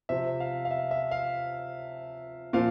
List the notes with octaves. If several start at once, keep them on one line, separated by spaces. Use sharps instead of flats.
C3 F3 E5
F5
F5
E5
E5
F5
A#2 F3 F5